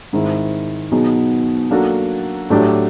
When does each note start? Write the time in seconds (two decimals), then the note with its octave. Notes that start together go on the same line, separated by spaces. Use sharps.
0.13 G#2 D#3 G#3 C4 E4
0.92 B2 F#3 B3 D#4 G#4
1.71 F#3 A#3 D4 F#4 A4
2.50 A2 F#3 A3 D4 G4